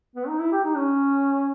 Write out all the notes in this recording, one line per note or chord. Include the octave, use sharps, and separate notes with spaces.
B3
D#4
E4
G4
D#4
C#4